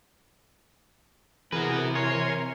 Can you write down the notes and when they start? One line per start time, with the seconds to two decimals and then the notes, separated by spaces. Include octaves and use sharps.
1.52 C3 E3 F#4 G#4 A#4 B4
1.95 A#4 C#5 G#5 C6